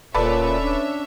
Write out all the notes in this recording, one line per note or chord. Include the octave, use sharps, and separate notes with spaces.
D#1 A#2 C#4 A4 B4 C#5 D5 E5
D4